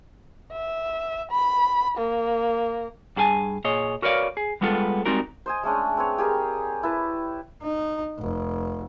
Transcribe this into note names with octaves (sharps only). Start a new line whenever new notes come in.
E5
B5
A#3
G2 F#4 G#4 A4 G#5 A5
A#2 G#4 C#5 D#5
F#4 A#4 B4 C#5 D5 F5
G#4
G3 G#3 B3 F4 G#4 A4
G3 G#3 C4 D#4 F#4 A#4
C5 D#5 G#5
G#3 A3 C#4 D4
C4 B4 C#5
G4 G#4 A#4
E4 B4 A5
D#4
F1